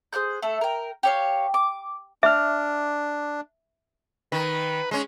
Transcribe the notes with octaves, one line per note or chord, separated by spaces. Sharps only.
G#4 C5 F#6 G6
A3 A4
A#4 G5
G4 C#5 F5
D6
D4 E5 D6 F6
D#3 B4
G#3 C#4